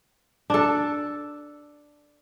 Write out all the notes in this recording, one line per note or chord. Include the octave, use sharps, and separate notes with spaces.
D4 A4